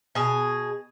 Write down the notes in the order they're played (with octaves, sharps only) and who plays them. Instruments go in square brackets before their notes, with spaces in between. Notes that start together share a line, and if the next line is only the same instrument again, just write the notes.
[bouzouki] B2 G#4